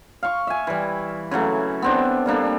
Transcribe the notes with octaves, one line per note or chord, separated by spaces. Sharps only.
F5 C#6
E5 G#5
E3 G3
C#3 E3 F#3 A3
B3 C4 D4
G3 A#3 D4 A4